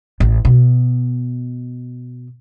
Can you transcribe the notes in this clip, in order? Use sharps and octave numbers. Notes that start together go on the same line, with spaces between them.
A1
B2